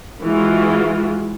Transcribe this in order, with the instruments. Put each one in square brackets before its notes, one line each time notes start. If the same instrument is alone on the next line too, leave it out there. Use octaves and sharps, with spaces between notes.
[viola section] E3 G#3 F4 F#4